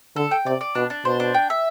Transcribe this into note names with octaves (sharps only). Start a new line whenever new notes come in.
D3 A4
G5
C3 D5
D5
B2 D4
D4
B2 C5
D4
G5
E5